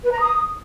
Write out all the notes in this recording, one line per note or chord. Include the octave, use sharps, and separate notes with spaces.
B4
A#5
D#6